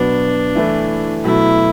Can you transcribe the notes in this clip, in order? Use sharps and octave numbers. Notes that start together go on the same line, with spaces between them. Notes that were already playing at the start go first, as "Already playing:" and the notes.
Already playing: B2 F#3 B3 D4
E3 A3 E4
B2 F#3 A3 E4